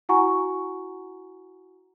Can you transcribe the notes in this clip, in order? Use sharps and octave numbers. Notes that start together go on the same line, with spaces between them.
E4 F#4 F#5 G#5 A#5 C#6